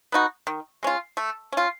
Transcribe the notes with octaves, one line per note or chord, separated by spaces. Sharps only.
B3 D#4 F#4
D#3
G#3 C#4 F4
A3
C#4 F4